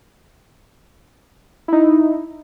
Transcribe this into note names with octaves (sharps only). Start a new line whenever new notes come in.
D#4 E4